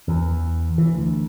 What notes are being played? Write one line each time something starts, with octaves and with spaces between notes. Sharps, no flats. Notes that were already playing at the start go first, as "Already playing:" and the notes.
E2
E3
D2